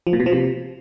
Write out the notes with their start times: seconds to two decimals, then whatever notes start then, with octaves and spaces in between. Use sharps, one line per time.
0.07 F3
0.13 A#2
0.20 B2
0.26 F3
0.33 C3